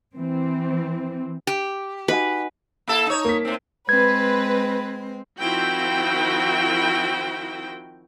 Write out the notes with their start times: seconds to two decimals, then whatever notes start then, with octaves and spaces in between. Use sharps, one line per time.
0.15 E3 C4
1.47 G4
2.08 D#4 F#4 B4 G#5
2.88 A#3 E4 A4
3.06 D#4 C#5
3.25 A#3 B6
3.45 A2 C4
3.89 G#3 C4 B4 G#6
5.39 D#3 F3 C4 E4 F#4 G5